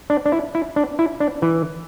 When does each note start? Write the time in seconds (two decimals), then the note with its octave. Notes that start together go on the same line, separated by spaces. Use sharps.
0.10 D4
0.26 D4
0.32 E4
0.55 E4
0.76 D4
0.99 E4
1.20 D4
1.42 E3